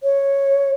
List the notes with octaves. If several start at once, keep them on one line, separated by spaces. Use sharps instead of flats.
C#5